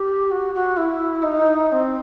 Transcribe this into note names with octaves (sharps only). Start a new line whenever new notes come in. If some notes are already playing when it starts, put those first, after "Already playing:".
Already playing: G4
F#4
F#4
E4
D#4
D#4
C4